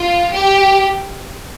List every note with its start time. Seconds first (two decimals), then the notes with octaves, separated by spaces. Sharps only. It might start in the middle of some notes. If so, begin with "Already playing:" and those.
Already playing: F4
0.32 G4